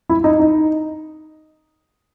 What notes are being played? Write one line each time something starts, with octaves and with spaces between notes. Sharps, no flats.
E4
D#4
D#4